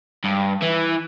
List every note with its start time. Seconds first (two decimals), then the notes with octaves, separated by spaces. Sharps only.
0.24 G2
0.62 E3